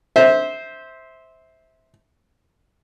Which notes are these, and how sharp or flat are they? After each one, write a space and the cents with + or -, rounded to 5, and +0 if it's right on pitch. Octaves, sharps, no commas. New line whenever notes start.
C5 +0 E5 -20